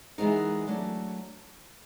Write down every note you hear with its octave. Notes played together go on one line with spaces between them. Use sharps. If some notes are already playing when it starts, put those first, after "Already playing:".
E3 G#3 B3 D#4 A#4
F#3 A3 D4